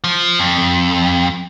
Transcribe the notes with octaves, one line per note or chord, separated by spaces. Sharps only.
F3
F2